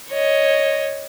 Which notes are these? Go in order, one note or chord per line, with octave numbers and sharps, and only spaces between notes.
C#5 D#5